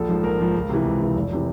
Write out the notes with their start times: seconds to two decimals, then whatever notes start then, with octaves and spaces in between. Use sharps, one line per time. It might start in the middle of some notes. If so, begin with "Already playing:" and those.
Already playing: A#1 A4
0.09 G#2 F3
0.24 A#1 A#4
0.39 G#2 F3
0.55 C#2
0.69 C3 E3
0.85 C#2
1.01 C3 E3
1.15 F1
1.32 C3 E3